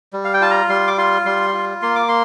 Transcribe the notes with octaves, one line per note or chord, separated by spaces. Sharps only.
G3
F5
G5
F4 A5
A#5
G3 C6
D6
F4 C6
G3 C6
F4
A#3 C6
D6
C6